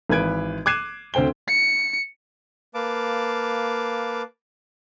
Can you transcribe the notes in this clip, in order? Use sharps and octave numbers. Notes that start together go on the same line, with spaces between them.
G#1 E3 B4 G#6 D7
D6 F#6 G#6 C7 D#7 E7
D2 C4 C5 G5 G7
C#7
A#3 B4 F5 A5 D6